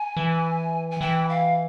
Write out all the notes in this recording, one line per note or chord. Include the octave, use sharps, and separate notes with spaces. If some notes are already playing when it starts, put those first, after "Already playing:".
Already playing: G#5
E3
G#5
E3 G5
F5